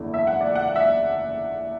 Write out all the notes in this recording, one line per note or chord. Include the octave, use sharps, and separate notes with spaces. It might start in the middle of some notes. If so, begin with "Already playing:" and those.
Already playing: F#1 E2 D3 A3 E4
E5
F#5
D5
F#5
F#5
E5